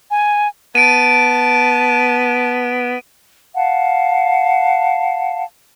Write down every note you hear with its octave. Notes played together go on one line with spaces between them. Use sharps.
G#5
B3 A5 D7 D#7
F5 F#5 A5